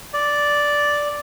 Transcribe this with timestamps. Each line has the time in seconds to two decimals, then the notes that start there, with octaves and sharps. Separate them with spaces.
0.14 D5